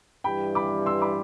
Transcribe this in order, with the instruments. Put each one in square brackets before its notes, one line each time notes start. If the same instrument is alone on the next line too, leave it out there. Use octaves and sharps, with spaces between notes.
[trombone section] G2 E3 G3 [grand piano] G5 B5
[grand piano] B5 D6
C6 E6
B5 D6